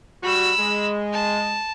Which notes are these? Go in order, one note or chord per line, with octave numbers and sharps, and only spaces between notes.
G3 F#4 B5 E6
G#3
A5